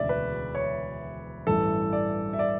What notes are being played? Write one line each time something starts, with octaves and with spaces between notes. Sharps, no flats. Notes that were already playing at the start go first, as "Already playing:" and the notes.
Already playing: E1 D2 C#3 D5 E5
B4
C#5
A1 G2 E3 A4
D5
E5
D5